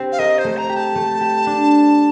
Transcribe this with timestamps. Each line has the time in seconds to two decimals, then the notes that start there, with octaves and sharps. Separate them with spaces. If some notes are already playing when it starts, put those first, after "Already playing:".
Already playing: C4 G4
0.12 F5
0.19 A#4 D#5
0.38 C5
0.44 A3
0.57 A#5
0.69 G4
0.76 A5
0.95 A3
1.21 G4
1.46 D4